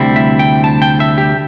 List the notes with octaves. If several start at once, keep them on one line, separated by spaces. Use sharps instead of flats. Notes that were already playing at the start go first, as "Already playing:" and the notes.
Already playing: D2 C3 G3 C4 E4
E5
G5
A5
G5
E5
G4